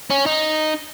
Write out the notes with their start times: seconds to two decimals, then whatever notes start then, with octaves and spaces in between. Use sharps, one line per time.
0.10 C#4
0.26 D#4